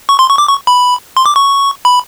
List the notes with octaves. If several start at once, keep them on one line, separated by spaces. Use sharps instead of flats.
C#6
C6
C#6
D6
C#6
B5
C6
D6
C#6
B5